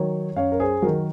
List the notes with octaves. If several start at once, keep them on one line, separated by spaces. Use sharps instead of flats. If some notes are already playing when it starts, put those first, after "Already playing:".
Already playing: D#3 F#3 C#5
F#2 C#5 F5
A#4
G#4 C5
D#3 F#3 F#4 A#4